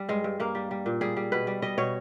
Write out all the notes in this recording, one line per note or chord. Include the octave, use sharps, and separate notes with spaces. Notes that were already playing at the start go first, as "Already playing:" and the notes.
Already playing: G3
G2 G#3
G2
G2 A#3
G3
G3
A#2
G3 G#4
G3
B2 B4
G3
G3 D#5
B2 C#5